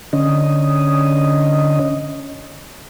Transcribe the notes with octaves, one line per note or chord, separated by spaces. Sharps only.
D3 C#4 D#5